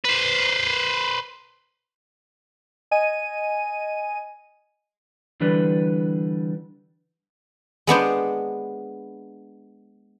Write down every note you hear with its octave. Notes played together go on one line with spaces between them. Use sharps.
B4 C5
D#5 G#5 D#7
D3 E3 G3 D4 B4
G#3 B3 D4 C5